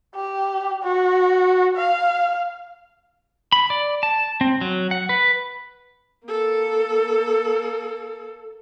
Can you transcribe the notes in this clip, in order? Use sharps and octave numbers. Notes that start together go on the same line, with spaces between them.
G4
F#4
F5
B5
D5
A5
C4
F#3
F#5
B4
A#3 A4